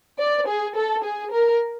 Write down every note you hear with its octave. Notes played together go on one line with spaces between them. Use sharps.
D5
G#4
A4
G#4
A#4